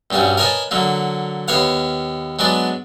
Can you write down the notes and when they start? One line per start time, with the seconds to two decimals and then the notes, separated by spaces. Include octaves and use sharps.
0.11 A#1 G2 G3 C#4 F#4
0.37 A#4 B4 C#5 D#5 G#5 A5
0.71 D3 F#3 A#3
1.48 D#2 B3 B4 C#5 F5 F#5
2.39 F#3 G#3 B3 D4 D5